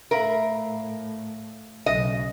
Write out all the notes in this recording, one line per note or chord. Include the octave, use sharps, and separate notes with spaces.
A2 A#4 E5 F5 B5
B1 C#3 D#5